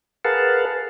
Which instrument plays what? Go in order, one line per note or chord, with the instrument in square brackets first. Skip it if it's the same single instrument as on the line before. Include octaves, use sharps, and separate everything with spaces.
[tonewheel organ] G#4 A#4 B4 F5 F#5 A5